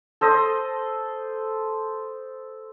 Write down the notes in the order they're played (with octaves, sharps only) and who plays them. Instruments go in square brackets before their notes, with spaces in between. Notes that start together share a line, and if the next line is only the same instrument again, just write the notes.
[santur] A4 C5 D#5